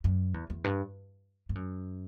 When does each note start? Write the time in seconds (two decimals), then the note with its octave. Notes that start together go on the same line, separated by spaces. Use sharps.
0.04 F#2
0.34 E2
0.50 E2
0.64 G2
1.49 G2
1.55 F#2